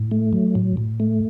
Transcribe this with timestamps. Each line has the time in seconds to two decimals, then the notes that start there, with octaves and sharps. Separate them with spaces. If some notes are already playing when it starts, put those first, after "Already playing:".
Already playing: A2
0.11 A3
0.33 F#3
0.55 A2
0.77 A2
1.00 A3